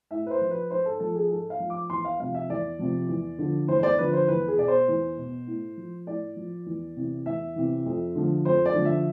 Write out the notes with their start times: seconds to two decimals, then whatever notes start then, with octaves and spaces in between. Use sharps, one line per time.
0.11 A2 E5
0.26 B4
0.31 C5
0.41 F3
0.51 B4
0.71 G#2 C5
0.85 A4
1.00 F3 A4
1.15 G#4
1.30 G#2 A4
1.50 F5
1.60 F3
1.70 D6
1.90 E2 C6
2.05 F5
2.20 C3 F3 F5
2.35 E5
2.49 E2 D5
2.79 C3 F3
3.09 E2
3.39 D3 F3
3.68 E2 C5
3.79 C5
3.83 D5
3.98 D3 F3 B4
4.13 C5
4.28 E2 B4
4.48 G#4
4.58 B2 D5
4.68 C5
4.88 E2
5.17 B2
5.47 A2
5.77 F3
6.07 A2 D5
6.36 F3
6.66 E2
6.96 C3 E3
7.26 E2 E5
7.56 C3 E3
7.86 F2
8.16 D3 F3
8.45 F2 C5
8.66 D5
8.75 D3 F3
8.85 E5